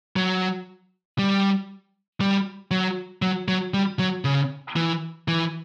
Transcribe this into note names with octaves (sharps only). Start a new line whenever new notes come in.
F#3
G3
G3
F#3
F#3
F#3
G3
F#3
C#3
E3
E3